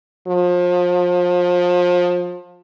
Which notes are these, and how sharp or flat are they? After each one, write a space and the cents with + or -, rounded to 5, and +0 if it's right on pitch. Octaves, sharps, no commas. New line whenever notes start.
F3 +30